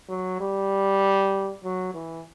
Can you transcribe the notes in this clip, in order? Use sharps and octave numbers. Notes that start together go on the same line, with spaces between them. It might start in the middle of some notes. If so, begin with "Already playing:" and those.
F#3
G3
F#3
E3